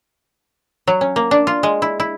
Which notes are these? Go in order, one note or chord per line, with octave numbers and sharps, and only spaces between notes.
F#3
C#4
A#3
D4
F4
G#3
E4
E4